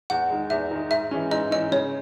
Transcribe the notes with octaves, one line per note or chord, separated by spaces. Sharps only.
E2 F#5
D#3 G#3
E2 E5
D#3 G#3
G#2 E5
E3 G#3 C#4
G#2 D#5
E3 G#3 C#4 D#5
C#3 C#5